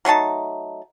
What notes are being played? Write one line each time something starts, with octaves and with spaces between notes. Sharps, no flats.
F#3 A3 D#4 A5